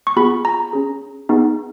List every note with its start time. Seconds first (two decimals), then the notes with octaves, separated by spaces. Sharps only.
0.07 C#6
0.17 B3 F4 G#4 B5
0.45 A#5
0.73 C#4 G#4
1.29 B3 D#4 G#4